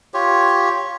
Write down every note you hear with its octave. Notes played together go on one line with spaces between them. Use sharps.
F4 G4 C#5